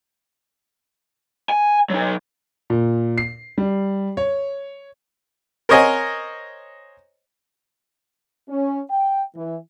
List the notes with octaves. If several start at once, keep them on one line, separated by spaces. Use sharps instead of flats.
G#5
F#3 D#4
A#2
C7
G3
C#5
A#4 C5 C#5 D#5 F#5 G#5
C#4
G5
E3